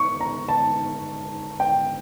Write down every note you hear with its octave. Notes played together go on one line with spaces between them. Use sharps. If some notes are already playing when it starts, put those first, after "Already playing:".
Already playing: C#6
A#5
A5
G5